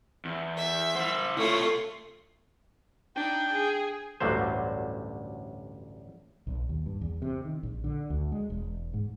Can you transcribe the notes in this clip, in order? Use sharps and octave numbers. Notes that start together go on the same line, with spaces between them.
E2
E5
E4 C5
C3 A3 F4 C#5
D4 D#4 G5
G#4
A1 D2 G2 D3 F#3 C5
B1
D#2
G2
E2
C3
D#3
A#1
D3
D2
G#3
E1
G#2